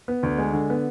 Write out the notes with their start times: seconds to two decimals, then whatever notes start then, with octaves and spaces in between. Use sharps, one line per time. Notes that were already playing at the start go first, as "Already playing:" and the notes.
0.08 B3
0.23 D2
0.38 G#3
0.53 D3
0.70 B3